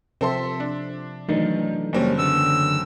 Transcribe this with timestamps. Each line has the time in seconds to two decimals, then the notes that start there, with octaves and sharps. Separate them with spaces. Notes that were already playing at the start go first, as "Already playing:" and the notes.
0.21 C3 F3 C4 A4 E5 C6
0.60 D4
1.29 D#3 E3 F#3 A3 D4 D#4
1.93 F#1 G3 A#3 C4 C#4
2.18 D3 B3 E6